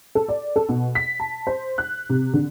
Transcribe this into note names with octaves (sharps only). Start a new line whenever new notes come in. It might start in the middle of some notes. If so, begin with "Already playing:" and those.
A4
D5
A4
B2
B6
A5
C5
F#6
C3
D3